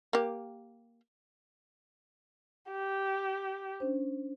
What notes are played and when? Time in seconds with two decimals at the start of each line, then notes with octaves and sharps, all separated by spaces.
0.13 A#3 G4
2.71 G4
3.80 C#4 D4 C5